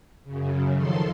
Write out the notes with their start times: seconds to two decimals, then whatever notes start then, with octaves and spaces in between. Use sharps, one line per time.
0.24 F#2 C#3
0.74 D#3 F3 A4 C6